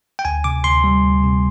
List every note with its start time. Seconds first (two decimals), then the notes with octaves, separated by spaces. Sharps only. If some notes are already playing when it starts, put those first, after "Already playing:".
0.19 G5
0.25 D2 G#5
0.44 C3 D6
0.64 D2 C6
0.84 G3
1.04 D2
1.24 C3